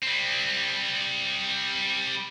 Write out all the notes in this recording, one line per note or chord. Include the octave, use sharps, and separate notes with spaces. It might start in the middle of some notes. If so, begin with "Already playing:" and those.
G3 C4